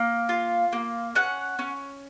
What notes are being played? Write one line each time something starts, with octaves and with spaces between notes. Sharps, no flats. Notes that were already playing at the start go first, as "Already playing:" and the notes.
Already playing: A#3
F4
A#3
C#4 F#5
C#4